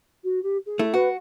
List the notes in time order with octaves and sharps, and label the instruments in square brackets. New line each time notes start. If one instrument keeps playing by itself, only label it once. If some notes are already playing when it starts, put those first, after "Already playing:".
[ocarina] F#4
G4
G#4
[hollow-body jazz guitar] A3 E4
[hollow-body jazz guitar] F#4 [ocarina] B4